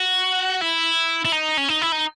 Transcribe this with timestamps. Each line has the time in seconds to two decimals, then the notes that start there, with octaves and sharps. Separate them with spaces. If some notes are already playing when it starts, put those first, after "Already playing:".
Already playing: F#4
0.61 E4
1.25 E4
1.32 D#4
1.57 C#4
1.68 D#4
1.81 E4
1.92 D#4